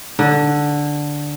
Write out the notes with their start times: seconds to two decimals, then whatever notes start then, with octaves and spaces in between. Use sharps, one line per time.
0.19 D3